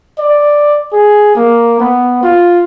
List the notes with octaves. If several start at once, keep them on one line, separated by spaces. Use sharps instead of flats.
D5
G#4
A#3
B3
F4